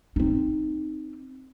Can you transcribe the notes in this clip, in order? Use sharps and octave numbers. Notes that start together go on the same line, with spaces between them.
C4 D#4